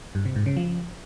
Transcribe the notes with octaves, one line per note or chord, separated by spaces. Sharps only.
G2
C3
G#2
C#3
F3